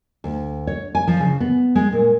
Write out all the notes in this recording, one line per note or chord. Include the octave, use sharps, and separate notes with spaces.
D2
C#5
G#5
F3
C#3
B3
G#3
A#2